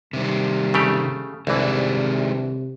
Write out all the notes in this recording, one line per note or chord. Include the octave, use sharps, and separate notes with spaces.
C3 D#3 G3 C4
C#3 A3 G4
C2 C3 D#3 E3 G#3 D4